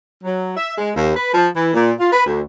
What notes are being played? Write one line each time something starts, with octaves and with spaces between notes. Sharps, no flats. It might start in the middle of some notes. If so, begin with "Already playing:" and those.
F#3
E5
G#3
D#2
B4
F3
E3
A#2
F4
B4
D2